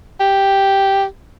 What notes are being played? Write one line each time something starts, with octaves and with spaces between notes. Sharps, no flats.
G4